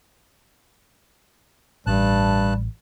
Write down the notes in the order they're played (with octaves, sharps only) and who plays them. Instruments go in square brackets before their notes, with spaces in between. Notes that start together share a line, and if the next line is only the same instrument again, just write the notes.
[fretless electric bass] A1 [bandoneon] G2 A5 F#6 [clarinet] G3